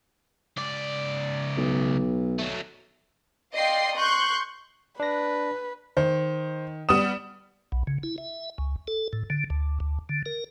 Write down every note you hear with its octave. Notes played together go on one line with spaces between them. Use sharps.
C#2 D5
B1
F#3 A3
D5 D#5 F5 G5 C6 C7
C6 C#6 F#6 G6
D4 B4 A#6
D#3 C5
G3 B3 D#6 E7
B1
C#3
E4
E5
C#2
A4
A2
D3
D2
D2
D3
A#4